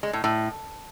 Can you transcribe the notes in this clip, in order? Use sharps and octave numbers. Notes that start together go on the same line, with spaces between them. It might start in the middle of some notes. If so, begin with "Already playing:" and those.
G#3
A2
A2